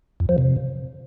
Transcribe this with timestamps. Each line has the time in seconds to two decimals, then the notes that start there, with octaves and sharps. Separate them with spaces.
0.20 F2
0.29 F3
0.38 C3